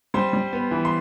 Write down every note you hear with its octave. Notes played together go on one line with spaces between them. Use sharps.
G3 C5 C6
G3
B3
E3
C6